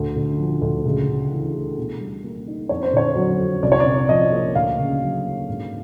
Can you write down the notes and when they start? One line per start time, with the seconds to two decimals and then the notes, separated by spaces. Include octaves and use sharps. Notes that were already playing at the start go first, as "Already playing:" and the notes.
Already playing: D2
0.16 D3
0.38 F3
0.62 D2
0.85 C#2
1.08 C#3
1.31 E3
1.54 A3
1.77 B2
2.00 G3
2.24 A#3
2.47 D#4
2.69 F2 C#5
2.83 C5
2.93 D3 C#5
3.16 F#3
3.39 F2
3.62 C2 D5
3.72 C#5
3.80 D5
3.86 C3
4.09 F3 D#5
4.33 A#3
4.55 D2 F5
4.78 C#3
5.01 F#3
5.24 A#3
5.48 G#2